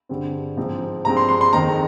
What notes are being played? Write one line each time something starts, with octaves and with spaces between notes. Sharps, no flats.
G2 D3 G#3 C4
G#2 F3 G#3 C4
G2 F3 G#3 C4 A#5
C6
C6
C6
F2 D#3 G#3 C4 A#5